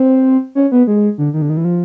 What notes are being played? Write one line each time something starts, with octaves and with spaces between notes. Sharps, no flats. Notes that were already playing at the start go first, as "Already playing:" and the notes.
Already playing: C4
C#4
B3
G#3
D3
D#3
D3
D#3
E3
F3